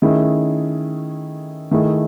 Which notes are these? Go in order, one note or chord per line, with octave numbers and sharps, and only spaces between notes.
D#3 A3 C#4 E4 G#4
D#3 A3 E4 G#4